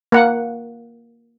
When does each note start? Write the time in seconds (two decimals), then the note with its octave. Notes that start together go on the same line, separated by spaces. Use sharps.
0.12 A#3 F#5